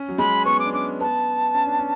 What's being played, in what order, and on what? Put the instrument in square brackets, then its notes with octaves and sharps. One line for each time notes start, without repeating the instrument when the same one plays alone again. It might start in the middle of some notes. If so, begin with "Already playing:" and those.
Already playing: [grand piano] C#4
F#3
[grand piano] G#3 [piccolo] B5
[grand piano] B3 [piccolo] C#6
[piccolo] D6
[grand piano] D4
[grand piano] C#4 [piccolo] D6
[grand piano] B3 [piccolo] A5
[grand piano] C#4
D4
C#4